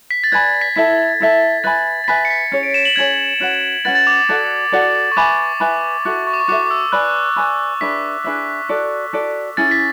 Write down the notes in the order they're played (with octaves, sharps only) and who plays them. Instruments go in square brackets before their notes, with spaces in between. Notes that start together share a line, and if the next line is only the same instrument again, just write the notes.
[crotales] B6
A6
[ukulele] B4 D5 G#5 B5 [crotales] G#6
[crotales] B6
[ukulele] E4 A4 E5 A5 [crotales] B6
[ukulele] E4 A4 E5 A5
[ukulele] B4 E5 G#5 B5 [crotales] A6
[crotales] A6
[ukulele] B4 E5 G#5 B5 [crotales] B6
[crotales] C#7
B6
[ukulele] C#4 G#4 C#5 [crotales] C#7
[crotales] D7
E7
F#7
[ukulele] C#4 G#4 C#5 [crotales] G#6
[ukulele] C#4 F#4 B4 F#5
[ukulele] C#4 F#4 B4 F#5 [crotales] A6
[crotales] A6
D6
[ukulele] F#4 A4 D5 F#5
F#4 A4 D5 F#5
[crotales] C#6
[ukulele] B4 E5 G#5 B5 [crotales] D6
[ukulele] B4 E5 G#5 B5
[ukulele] F#4 A4 E5 [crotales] C#6
[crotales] C#6
D6
C#6
[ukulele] F#4 A4 E5 [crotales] D6
[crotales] D6
E6
[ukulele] B4 D5 G#5 B5 [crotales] F#6
[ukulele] B4 D5 G#5 B5
[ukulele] D4 G#4 B4 E5 [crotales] B6
[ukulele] D4 G#4 B4 E5
F#4 A4 D5
F#4 A4 D5
[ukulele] C#4 E4 G#4 [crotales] A6
[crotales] B6